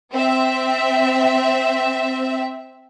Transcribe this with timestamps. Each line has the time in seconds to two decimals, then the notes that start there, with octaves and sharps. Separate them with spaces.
0.13 C4 E5